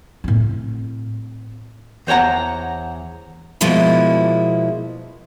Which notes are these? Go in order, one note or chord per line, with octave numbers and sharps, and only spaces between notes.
A2 C4
E2 C5 C#5 F#5 A#5
B2 F3 G#3 A#3 E4